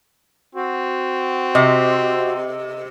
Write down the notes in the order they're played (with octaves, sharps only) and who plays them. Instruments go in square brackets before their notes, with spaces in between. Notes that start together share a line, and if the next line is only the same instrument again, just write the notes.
[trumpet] C4 [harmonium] F#4
[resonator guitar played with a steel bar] C3 [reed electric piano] D#5